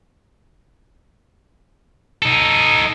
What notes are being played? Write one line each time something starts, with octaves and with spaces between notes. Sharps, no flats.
D#4 A4